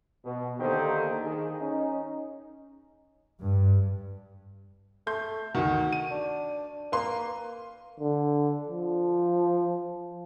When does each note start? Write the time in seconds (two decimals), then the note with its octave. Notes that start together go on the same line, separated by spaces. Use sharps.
0.24 B2
0.60 D3 D#3 A#3 G4 A4 C5
1.24 D#3 G#4
1.61 C#4 D#4
3.39 G2
5.07 A3 C6 G6
5.55 D2 D#3 F#4
5.92 D#7
6.11 D4
6.92 A#3 B4 C6
8.00 D3
8.68 F3